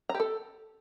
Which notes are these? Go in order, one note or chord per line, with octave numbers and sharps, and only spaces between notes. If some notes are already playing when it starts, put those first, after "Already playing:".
A#5
G4
A4